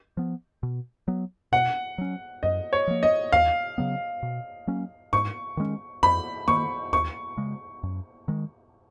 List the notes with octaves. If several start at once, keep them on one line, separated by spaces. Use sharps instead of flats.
F3 B3
B2
F#3 B3
B2 F#5
F#3 C#4
F#2 D#5
C#5
F3 A#3
D#5
D#2 F5
C#3 F#3 B3
B2
F#3 A#3 C#4
G#2 C#6
D#3 G#3 C#4
F2 B5
D#3 A#3 C#6
D#2 C#6
C#3 G#3
F#2
D#3 G#3